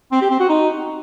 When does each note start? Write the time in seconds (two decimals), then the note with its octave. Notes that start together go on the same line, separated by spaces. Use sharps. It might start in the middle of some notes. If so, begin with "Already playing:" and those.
0.12 C4
0.21 G4
0.31 C4
0.40 F#4
0.49 D#4